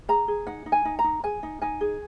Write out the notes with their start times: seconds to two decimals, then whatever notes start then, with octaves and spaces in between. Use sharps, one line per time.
0.09 G#4 A#5
0.28 G#4
0.47 D#4 F#5
0.66 D#4
0.72 G#5
0.85 D#4
0.99 A#5
1.04 D#4
1.24 G#4 G#5
1.43 D#4
1.62 D#4 G#5
1.81 G#4